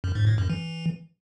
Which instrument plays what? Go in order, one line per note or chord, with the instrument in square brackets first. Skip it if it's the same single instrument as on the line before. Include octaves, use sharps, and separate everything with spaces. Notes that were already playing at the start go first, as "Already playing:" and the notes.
[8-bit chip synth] F#2
G#2
A2
F#2
E3